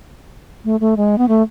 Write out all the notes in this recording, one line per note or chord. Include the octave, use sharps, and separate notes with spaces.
A3
A3
G#3
B3
A3